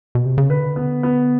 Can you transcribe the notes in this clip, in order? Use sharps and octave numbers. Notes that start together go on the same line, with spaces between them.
B2
C3
C#3
D3 B4
B3
B3